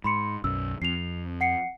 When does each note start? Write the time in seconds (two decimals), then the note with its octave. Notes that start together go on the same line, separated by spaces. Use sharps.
0.04 G#2 B5 C6 C#7
0.44 B1 F#2 E6
0.82 F2 C7 F7
1.41 F#5 C7 C#7